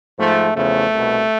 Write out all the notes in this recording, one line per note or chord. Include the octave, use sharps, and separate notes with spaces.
G#2 F3 A3
E2 C#3 F3 A3
C2 B2